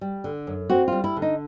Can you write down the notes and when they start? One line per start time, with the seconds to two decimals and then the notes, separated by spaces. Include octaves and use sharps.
0.01 G3
0.24 D3
0.47 F#2
0.70 C4 F#4
0.88 G3 F4
1.04 E4
1.16 D3
1.22 D#4